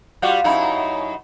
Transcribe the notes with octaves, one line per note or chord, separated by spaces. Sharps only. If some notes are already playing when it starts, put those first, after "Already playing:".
G3 F4 F#4
F#2 D#4 E4